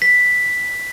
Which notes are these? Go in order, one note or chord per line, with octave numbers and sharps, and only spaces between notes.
B6